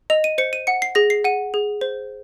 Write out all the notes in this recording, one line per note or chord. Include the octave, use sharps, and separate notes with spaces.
D#5 F7
D#7
C5 C#7
D#7
F#5 C#7
C7
G#4 A#6
C7
F#5 D#7
G#4
C5